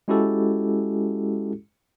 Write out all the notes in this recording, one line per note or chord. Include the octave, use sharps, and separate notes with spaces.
G#3 C#4 E4 F#4 G4 A4